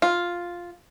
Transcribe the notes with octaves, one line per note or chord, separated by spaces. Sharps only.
F4